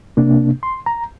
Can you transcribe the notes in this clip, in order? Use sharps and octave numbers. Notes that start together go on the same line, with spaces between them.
C3 A#3 D4
C6
A#5